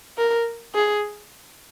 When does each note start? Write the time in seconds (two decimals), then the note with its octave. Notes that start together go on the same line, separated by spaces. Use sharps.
0.18 A#4
0.75 G#4